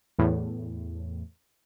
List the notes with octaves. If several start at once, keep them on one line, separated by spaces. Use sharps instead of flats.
E2 A2